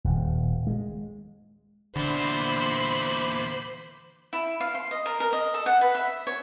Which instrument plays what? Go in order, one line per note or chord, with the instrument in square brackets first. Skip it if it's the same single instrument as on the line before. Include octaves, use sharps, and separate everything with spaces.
[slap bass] D#1
G#3
[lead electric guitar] E2 A#2 [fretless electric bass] D3 [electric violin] C5 B5
[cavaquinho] E4
F5
C6
D#5
A#4
A#4
D#5
A4
F#5
B4
E5
C#5